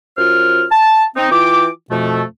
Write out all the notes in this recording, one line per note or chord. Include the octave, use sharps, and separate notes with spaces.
F#2 F4 C5 F6
A5
C4 D#4
E3 F4 G5 D6
F2 B2 F3 A3